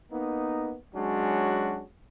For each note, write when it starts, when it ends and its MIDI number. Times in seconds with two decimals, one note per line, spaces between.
0.11 0.75 58
0.11 0.75 59
0.11 0.75 63
0.93 1.83 54
0.93 1.83 56
0.93 1.83 61
0.93 1.83 62
0.93 1.83 66